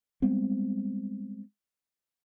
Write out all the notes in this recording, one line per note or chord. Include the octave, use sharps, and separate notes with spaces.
G3 G#3 B3 C4